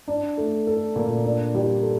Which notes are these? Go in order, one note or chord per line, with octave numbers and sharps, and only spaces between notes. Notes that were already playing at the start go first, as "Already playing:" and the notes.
D4
A3
A4
A#2
D4
G3
A4